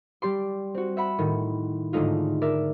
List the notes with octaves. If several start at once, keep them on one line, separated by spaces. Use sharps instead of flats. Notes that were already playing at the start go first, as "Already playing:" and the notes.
G3 G4 D5 C6
C4 F#4
E5 F#5 B5
A2 D#3
G#2 D3 G#3 A3 D#4 F4
A#4 D5 E5